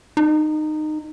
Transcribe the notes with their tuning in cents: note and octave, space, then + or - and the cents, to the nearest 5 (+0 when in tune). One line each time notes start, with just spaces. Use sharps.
D#4 -20